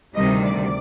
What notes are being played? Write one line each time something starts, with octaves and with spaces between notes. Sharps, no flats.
D2 C3 D#3 G3 D#5
D5